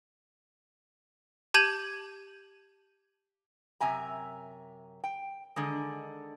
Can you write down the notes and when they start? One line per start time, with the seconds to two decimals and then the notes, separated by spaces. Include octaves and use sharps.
1.54 G4 A5 G6 G#6 D#7 F#7
3.80 F#2 C3 E5 G#5 A#5
5.04 G5
5.56 D3 D#3 G#3